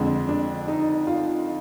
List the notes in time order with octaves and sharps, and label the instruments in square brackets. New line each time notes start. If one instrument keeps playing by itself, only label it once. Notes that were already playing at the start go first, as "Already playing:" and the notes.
Already playing: [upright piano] F2 D3 G#3 D4
D4
D#4
F4